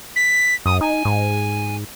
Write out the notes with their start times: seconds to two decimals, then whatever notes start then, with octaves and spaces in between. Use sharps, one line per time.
0.16 B6
0.66 F#2 D#6
0.81 D#4 G#5
1.05 G#2